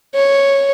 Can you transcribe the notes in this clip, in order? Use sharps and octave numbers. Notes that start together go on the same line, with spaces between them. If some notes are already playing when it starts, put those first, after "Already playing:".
C#5